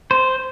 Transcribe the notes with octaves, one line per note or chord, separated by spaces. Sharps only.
C5